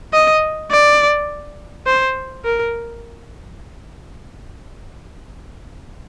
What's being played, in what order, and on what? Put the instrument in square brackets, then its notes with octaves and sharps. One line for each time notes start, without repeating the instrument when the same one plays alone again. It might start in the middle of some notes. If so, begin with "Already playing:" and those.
[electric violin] D#5
D5
C5
A#4